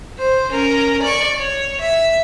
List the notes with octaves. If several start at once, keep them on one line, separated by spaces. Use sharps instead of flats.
C5
C#4 A#4
D5 C#6
C#5
E5